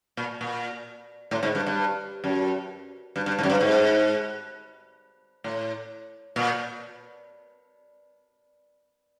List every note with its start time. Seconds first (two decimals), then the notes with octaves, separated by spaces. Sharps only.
0.17 A#2
0.41 A#2
1.31 A2
1.43 G#2
1.55 G2
1.67 G2
2.24 F#2
3.16 G2
3.26 G2
3.39 G#2
3.43 F#2
3.50 G2
3.61 G#2
5.44 A2
6.36 A#2